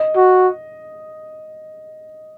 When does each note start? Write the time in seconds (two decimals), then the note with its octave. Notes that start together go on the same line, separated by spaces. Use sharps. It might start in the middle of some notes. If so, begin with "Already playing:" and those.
Already playing: D#5
0.16 F#4